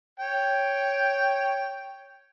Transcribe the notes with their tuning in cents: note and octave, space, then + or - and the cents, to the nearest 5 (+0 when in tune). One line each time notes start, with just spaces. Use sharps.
C#5 +0 G5 +0